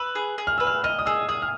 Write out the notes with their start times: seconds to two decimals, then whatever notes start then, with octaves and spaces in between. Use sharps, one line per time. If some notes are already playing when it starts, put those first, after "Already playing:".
Already playing: B4 E6
0.15 G#4
0.38 G#4
0.47 F6
0.58 B4 E6
0.67 F6
0.84 D#5 F6
0.99 D#6
1.06 G#4 E6
1.29 G#4 D#6
1.42 F6